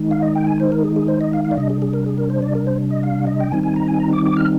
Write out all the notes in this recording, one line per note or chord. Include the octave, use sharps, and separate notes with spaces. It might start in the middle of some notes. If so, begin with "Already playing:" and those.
Already playing: D#3 G#3 D#4
F5
D#5
G5
G#5
C5
A#4
G#4
G#4
C5
D#5
F5
F5
D5
C3 G3 D4 D#5
G#4
G#4
A#4
G#4
A#4
C5
D5
A#4
C5
D#5
F5
D#5
G5
D#3 G3 C4 D#4 G#5
G#5
A#5
G#5
A#5
D6
D6
F6